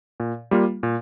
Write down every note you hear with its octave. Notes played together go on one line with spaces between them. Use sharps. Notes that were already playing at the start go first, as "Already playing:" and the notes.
A#2
G3 A#3 F4
A#2